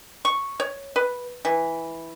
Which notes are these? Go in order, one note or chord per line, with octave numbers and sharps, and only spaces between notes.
C#6
C#5
B4
E3